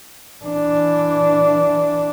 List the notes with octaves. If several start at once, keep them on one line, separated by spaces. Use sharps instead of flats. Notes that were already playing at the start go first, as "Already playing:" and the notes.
E3 D4